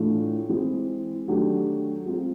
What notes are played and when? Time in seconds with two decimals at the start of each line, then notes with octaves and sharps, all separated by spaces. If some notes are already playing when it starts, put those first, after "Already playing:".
Already playing: A2 E3 A3 D4 F4
0.49 E3 G#3 C4
1.27 D#3 F#3 A3 D4 G4
2.06 G#3 C4 F4